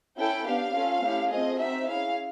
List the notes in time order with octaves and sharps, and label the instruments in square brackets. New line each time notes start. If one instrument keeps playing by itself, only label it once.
[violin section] C#4 E4 A4 G5
B3 D4 G4 F5
C#4 F4 A4
A3 C#4 E4 G4
A3 C4 F4 G#4 D#5
C4 D#4 F#4 E5
C#4 E4 G#4 F5